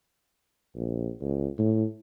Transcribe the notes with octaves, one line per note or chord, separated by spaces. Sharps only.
A#1
C#2
A2